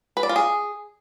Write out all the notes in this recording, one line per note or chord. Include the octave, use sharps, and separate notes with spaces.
B4
D5
F4
G#4